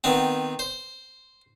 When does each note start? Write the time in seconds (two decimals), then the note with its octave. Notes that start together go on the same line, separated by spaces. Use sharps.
0.04 D#3 B3 C4
0.59 C5